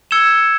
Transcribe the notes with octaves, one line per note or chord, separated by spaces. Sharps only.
E6 G#6 C#7 E7 G7